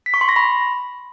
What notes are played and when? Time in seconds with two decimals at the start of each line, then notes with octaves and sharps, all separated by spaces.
0.06 B6
0.14 C#6
0.21 C6
0.29 A#6
0.36 B5